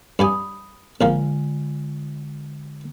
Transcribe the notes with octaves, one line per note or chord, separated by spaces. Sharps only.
G2 G4 G#5 B5 D#6
A#1 D3 F3 G#3 F4 A#4